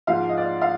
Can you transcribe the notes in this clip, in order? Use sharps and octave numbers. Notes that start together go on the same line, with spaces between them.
G#2 F3 F5
D#5
D5
F5